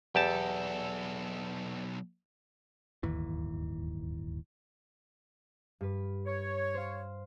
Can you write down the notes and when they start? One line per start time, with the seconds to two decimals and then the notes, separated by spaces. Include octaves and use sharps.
0.15 B1 E2 G4 A4 A5
3.03 D1 G1 D#2 E3
5.81 G2 B4
6.26 C#5
6.74 C5 F5